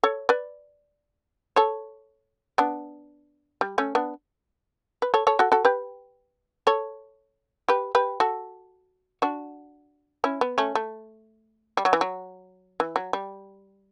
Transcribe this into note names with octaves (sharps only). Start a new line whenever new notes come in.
A4 C#5
B4 D5
A4 C#5
B3 D4
G3
A3 C#4
B3 D4
B4
A4 C#5
A4 C#5
F#4 A4
F#4 A4
G4 B4
A4 C#5
G4 B4
G4 B4
F#4 A4
D4 F#4
C#4 E4
B3
A3 C#4
A3
G3
F#3
E3
F#3
E3
F#3
G3